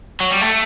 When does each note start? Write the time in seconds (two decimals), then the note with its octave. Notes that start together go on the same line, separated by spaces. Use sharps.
0.20 F#3
0.31 G3
0.41 A3